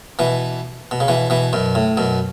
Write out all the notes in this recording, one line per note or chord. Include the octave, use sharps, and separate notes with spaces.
B2 E3
B2
C#3
B2 E3
B2 E3
F#2 B2
A2
F#2 B2